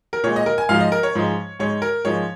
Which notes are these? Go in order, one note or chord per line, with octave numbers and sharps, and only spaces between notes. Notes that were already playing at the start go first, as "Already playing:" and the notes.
A#4
A#2 G#3 C#5
D#5
A#4
G#5
G#2 F3 G#3 F5
D#5
A#4
C#5
G#2 F3 G#3
G#2 G#3 C#5
A#4
G#2 F3 G#3 C#5